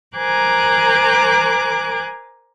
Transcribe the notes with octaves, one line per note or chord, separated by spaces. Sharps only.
A#4 C5 G#5 A#5 D6 F#6